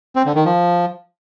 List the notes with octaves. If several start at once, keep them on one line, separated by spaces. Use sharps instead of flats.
C4
D3
D#3
F3